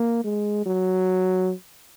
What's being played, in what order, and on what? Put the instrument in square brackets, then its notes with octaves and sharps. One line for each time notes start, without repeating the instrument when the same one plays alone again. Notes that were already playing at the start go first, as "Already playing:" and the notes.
Already playing: [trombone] A#3
G#3
F#3